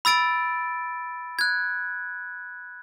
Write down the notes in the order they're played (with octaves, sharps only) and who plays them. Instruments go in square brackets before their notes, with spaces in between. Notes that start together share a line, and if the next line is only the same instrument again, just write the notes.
[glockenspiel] B5 E6 A6 D7
F#6 G#6